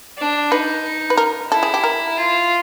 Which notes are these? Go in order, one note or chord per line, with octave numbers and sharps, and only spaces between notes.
D4
D#4 B4
B4
A#4
E4 A4
G#4
G4
A#4
F4